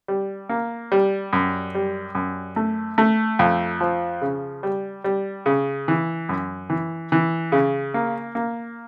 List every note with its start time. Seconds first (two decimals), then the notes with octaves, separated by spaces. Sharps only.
0.08 G3
0.49 A#3
0.92 G3
1.33 F#2
1.75 G3
2.15 F#2
2.56 A3
2.98 A3
3.39 F2
3.81 F3
4.21 C#3
4.63 G3
5.04 G3
5.46 C#3
5.88 E3
6.29 F#2
6.70 E3
7.12 E3
7.52 C#3
7.94 A#3
8.35 A#3